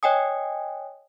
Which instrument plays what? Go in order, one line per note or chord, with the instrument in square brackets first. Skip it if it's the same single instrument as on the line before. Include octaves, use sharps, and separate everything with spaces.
[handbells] C#5 D#5 G5 G#5 D#6